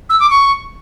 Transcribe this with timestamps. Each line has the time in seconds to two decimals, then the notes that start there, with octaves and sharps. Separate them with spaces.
0.10 E6
0.20 D6
0.30 C#6